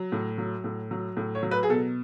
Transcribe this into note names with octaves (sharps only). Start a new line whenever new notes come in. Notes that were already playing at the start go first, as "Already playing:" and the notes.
Already playing: F#3
A2
F#3
A2
F#3
A2
C#5
F#3
B4
G#4
B2 A4